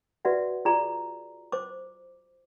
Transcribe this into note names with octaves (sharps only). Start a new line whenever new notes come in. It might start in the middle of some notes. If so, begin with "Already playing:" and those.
F#4 B4 D5 E5 F#5
F4 G#4 D5 A#5
C5 D6